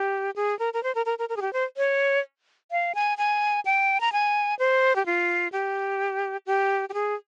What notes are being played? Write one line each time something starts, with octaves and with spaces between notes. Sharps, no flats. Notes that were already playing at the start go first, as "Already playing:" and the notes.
Already playing: G4
G#4
A#4
A#4
C5
A#4
A#4
A#4
A#4
G#4
G4
C5
C#5
F5
G#5
G#5
G5
A#5
G#5
C5
G4
F4
G4
G4
G4
G#4